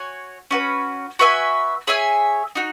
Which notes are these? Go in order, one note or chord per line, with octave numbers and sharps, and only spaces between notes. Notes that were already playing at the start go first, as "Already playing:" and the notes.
Already playing: F#4 C#5 G#5
C#4 F#4 B4
F#4 B4 E5 G#5
G#4 C#5 E5 G#5
D#4 F#4